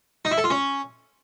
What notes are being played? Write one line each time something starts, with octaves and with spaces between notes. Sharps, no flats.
D#4
E4
A4
F4
C#4